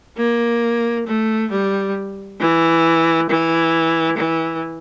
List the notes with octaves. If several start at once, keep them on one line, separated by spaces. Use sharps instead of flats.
A#3
A3
G3
E3
E3
E3